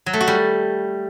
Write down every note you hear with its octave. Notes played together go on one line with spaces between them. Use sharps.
F#3
A3
F#4
G3